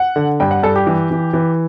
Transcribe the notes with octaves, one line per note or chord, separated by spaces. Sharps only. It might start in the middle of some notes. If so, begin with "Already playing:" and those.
Already playing: F#5
D3
G2 G5
F#5
G2 A4
G4
E3
E3
E3